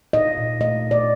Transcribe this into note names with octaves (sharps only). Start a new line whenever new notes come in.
D#4 D#5
A#2
A3 D#5
A#2
D5